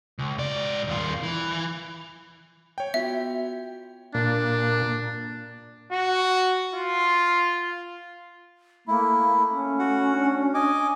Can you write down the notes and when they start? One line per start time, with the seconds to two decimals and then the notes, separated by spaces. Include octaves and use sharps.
0.19 C#2
0.38 G#2 D5
0.87 D#2 F4
1.23 E3
2.78 C#5 G5
2.94 B3 F4 F#4 E5
4.14 A#2 D4
5.92 F#4
6.74 F4
8.88 A3 A#3 E4
9.48 C#4
9.79 F#4 F#5
10.11 D4
10.54 D#5 G#5 D6